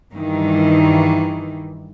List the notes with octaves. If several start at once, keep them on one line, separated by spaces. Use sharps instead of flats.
G2 D#3 E3